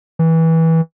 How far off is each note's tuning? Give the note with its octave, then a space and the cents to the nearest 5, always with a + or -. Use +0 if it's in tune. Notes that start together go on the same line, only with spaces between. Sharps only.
E3 -20